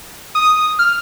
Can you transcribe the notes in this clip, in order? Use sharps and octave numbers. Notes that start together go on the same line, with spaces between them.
D#6
F6